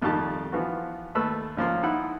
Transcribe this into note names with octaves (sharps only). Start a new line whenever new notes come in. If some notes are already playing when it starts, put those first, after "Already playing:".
C2 F2 A#2 D#3 G4 A5
E3 F3 B3 F#4
D#2 A3 B4 E6
C#2 F3 A#3 C6
D#4 E4 F#5